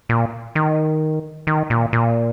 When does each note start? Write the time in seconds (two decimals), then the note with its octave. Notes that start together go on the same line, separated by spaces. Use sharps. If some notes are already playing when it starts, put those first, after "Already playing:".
0.09 A#2
0.55 D#3
1.47 D#3
1.70 A#2
1.93 A#2